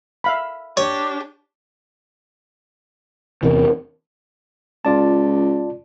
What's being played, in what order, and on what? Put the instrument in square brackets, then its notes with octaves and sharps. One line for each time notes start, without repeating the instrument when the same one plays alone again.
[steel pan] E5 F5 B5
[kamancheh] D4 G4 [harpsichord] C#5
[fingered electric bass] E2 C3 E3 [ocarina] A#4
[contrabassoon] C#2 [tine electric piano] F4 D5 A5